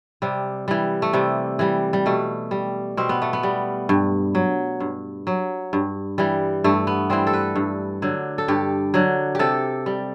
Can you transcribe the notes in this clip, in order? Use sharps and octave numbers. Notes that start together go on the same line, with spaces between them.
C3 G3
E3 G3
A3
C3 G3
E3 G3
G3
B2 A3
G3
B2 C4
B3
A3
B3
G3
G2
F#3
G2
F#3
G2
E3 G3
G2 A3
B3
E3 G3 C4
A4
B4
G2
D3 F#3
A4
G2 G4
D3 F#3
C3 G4 A4
G3